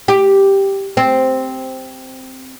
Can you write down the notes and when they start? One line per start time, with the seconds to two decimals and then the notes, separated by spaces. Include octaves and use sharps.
0.08 G4
0.97 C4